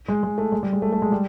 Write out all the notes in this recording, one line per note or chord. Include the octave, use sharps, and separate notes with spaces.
G#3
G#3
A3
G#3
G3
G#3
A3
A3
G#3
G3